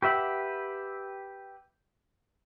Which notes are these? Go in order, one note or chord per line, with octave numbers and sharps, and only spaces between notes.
G4 B4 E5 F#5